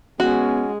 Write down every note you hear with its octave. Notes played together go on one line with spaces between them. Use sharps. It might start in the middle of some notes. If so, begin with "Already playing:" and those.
G#3 B3 C#4 F#4